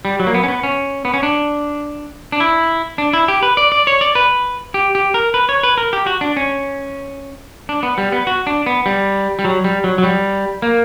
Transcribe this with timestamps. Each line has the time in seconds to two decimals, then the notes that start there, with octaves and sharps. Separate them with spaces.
0.05 G3
0.19 F#3
0.27 A#3
0.34 B3
0.44 C#4
0.48 B3
0.63 C#4
1.05 B3
1.14 C#4
1.23 D4
2.32 D4
2.40 E4
2.98 D4
3.13 E4
3.28 G4
3.43 B4
3.57 D5
3.72 D5
3.87 C#5
4.01 D5
4.15 B4
4.74 G4
4.95 G4
5.14 A#4
5.34 B4
5.49 C#5
5.63 B4
5.78 A#4
5.93 G4
6.06 F#4
6.21 D4
6.37 C#4
7.69 D4
7.83 B3
7.98 G3
8.12 B3
8.27 F#4
8.47 D4
8.66 B3
8.86 G3
9.39 G3
9.45 F#3
9.64 G3
9.84 F#3
9.98 F#3
10.03 G3
10.62 A#3